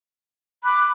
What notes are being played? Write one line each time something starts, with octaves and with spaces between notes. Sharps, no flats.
B5 D6 F#6